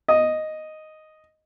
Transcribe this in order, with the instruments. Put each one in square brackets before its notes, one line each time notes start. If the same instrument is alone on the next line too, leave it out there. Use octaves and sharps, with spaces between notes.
[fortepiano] D#5